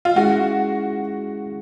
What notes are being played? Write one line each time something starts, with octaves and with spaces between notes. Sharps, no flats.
F4
G#3 C#4 E4 F#4 G#4